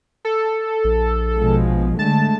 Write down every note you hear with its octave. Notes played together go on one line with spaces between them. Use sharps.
A4
A#1
B2 F3 G#3
D3 G#3 A3 A5